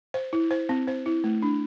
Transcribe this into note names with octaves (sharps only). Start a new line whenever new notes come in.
C5
E4
C5
C4
C5
E4
A3
D4